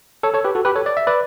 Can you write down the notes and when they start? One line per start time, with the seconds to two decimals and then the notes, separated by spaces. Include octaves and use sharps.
0.23 A4 C#5
0.34 A4 C#5
0.44 G4 B4
0.55 F#4 A4
0.65 G4 B4
0.76 A4 C#5
0.86 D5
0.97 E5
1.07 B4 D5